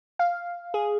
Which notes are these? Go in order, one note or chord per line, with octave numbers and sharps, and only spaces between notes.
F5
G#4